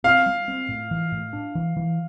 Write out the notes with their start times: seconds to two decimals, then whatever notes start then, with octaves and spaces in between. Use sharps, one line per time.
0.04 C4 F5
0.26 G3
0.48 C4
0.69 A2
0.91 E3
1.12 A2
1.33 D4
1.55 E3
1.77 E3